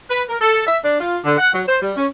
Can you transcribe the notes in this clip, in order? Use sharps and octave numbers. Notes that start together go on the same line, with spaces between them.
B4
A#4
A4
E5
D4
F4
D3
F#5
F#3
C5
G3
C#4